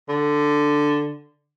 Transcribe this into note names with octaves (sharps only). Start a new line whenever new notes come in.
D3